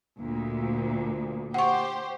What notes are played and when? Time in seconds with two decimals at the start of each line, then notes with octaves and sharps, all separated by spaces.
0.19 D2 A#2
1.54 G4 C5 F#5 C#6